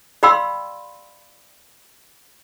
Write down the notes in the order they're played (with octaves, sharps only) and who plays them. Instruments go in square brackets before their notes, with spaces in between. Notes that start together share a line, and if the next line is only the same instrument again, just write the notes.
[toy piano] D5 F5 G5 B5 C6 E6